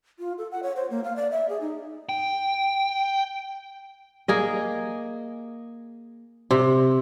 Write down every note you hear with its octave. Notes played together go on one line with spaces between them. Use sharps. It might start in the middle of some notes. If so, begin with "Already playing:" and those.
F4
A4
F#5
C#5
C5
A#3
F5
D5
E5
G#4
D#4
G5
A#3 G#4 D#5
C3